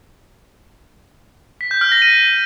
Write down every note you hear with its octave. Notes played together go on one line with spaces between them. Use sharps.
B6
G6
F6
A#6
D#7